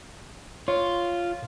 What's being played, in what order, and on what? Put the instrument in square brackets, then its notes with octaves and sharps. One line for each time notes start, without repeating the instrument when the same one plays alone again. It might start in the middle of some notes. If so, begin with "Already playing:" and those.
[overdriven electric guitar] F4 [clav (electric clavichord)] C#5